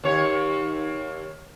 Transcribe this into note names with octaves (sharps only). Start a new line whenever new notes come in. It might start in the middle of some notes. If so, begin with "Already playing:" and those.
D#2 C#5